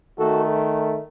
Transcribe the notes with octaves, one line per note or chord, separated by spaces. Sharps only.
D#3 A3 F#4 A4